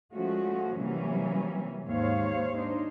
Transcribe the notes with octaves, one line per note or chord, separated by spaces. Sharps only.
F3 G#3 A3 C#4 F#4
C3 E3 F#3 G3 A#3 C#4
D#2 G#2 C5 C#5 F5
D4 D#4 C5